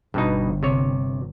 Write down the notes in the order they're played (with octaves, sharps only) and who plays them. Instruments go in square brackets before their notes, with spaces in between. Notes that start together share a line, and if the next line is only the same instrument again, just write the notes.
[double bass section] G1 [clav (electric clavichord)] G2 B2 D#4
[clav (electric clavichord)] C3 C#5